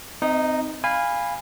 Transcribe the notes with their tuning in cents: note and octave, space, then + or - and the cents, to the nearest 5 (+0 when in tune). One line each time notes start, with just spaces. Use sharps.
C4 -25 D#4 -10 D#5 +45
F5 +0 G#5 -20 B5 +0